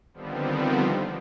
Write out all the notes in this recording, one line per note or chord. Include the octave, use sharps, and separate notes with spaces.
D3 D#3 F3 G3 B3 C4